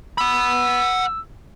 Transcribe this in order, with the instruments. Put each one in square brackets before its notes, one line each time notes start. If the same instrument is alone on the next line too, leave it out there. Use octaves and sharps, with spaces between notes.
[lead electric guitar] F#5 B5 [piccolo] E6